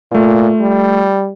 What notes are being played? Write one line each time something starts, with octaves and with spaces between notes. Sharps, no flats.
A#2 A3 F4
G3